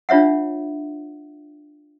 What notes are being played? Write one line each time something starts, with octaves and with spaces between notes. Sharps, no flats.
D4 F4 C#5 E5 F#5